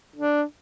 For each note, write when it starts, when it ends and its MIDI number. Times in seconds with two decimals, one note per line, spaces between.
0.16 0.43 62